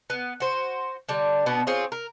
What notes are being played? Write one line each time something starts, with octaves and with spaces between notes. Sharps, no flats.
B3
F#4 C5
D3 G3
B2 B3 D4
C4 F4 G#4 C#5
A#4